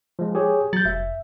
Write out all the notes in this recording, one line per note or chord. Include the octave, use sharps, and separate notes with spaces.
F3 G#3
G4 G#4 C#5
F#3 G6 A6
F1 E5